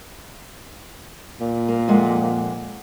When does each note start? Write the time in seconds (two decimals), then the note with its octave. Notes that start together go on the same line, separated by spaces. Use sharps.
1.40 A#2
1.68 A#3
1.88 F2 G#3 F#5